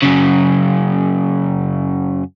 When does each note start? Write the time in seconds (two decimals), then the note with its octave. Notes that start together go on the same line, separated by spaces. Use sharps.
0.02 F#2 C#3